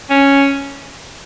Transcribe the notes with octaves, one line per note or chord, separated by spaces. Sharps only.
C#4